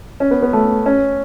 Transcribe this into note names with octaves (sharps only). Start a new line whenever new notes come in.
C#4
B3
B3
A3
C#4